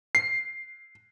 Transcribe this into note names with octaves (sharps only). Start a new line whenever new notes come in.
C7